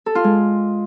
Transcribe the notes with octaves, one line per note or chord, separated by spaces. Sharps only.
A4
F4
G#3